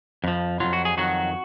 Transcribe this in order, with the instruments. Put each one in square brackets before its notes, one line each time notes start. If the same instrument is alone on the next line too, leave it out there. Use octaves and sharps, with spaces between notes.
[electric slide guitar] F2 F3
F2 D#3 F#3 F4
F#4
G#4
F2 D#3 F#3 F#4